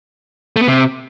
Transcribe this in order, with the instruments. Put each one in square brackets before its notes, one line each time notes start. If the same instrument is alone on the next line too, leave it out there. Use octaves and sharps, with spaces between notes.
[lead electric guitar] A3
B3
C3